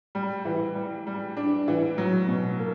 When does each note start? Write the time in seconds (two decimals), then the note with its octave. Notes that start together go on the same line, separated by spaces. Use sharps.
0.15 G3
0.45 E3
0.75 G3
1.07 G3
1.37 D4
1.68 E3
1.98 F#3
2.28 B2
2.59 A#3